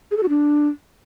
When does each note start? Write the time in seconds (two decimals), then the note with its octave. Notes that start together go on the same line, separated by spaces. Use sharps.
0.11 G#4
0.17 A4
0.23 F#4
0.29 D4